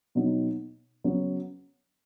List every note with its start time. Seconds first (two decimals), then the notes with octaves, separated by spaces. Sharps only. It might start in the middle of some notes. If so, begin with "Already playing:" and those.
0.15 B2 F#3 B3 D#4
1.04 C#3 F#3 B3 F#4